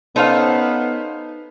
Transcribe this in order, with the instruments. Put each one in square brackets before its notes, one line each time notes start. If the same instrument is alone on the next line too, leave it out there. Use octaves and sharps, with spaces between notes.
[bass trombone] B3 [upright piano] C#4 C5 F5 [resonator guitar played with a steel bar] D#4 A4